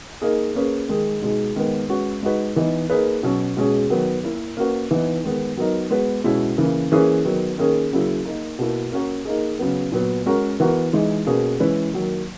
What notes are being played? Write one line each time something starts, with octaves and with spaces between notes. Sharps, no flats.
A#3 D#4 G#4
A#3 C#4 G#4 B4
D#3 G#3 D#4 G#4
B2 G#3 D#4 G#4
D#3 G#3 B3
G#3 C#4 F#4 B4
G#3 D#4 F#4 B4
E3 B3 D#4
A#3 D#4 G#4 B4
B2 F#3 C#4
B2 G#3 C#4 G#4
D#3 F#3 B3
A#3 E4 A#4
A#3 C#4 F#4 B4
E3 B3 D#4
D#3 G#3 B3
F#3 B3 D#4 A#4
G#3 B3 F#4 B4
B2 G#3 C#4 E4
C#3 E3 A#3
E3 A#3 C#4 G#4 B4
D#3 F#3 B3
D#3 A#3 C#4 G#4
C#3 F#3 A#3 E4 G#4
A#3 D#4 A#4
B2 A#3 E4
A#3 C#4 F#4 A#4
A#3 D#4 G#4
C#3 F#3 B3
A#2 F#3 B3
G#3 C#4 F#4 A#4
E3 B3 F#4 A#4
E3 G#3 D#4
B2 A#3 C#4 G#4 B4
E3 G#3 C#4 E4 B4
D#3 F#3 A#3